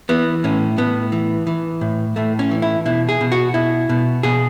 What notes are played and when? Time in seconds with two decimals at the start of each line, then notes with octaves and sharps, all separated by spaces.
0.09 E3 B3
0.44 A2 C#4
0.78 A2 B3
1.12 E3
1.47 E3
1.81 A2
2.16 A2 A3
2.39 C#4
2.51 E3
2.62 E4
2.85 B2 E4
3.09 G#4
3.21 B2
3.32 F#4
3.54 B2 E4
3.89 B2
4.23 B2 G#4